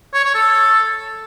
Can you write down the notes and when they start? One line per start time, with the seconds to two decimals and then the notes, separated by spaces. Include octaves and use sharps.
0.13 C#5
0.24 C#5
0.35 A4